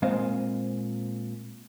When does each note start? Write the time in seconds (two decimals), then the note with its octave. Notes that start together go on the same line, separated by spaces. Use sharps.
0.02 A#2 G#3 C4 C5 D#5 F5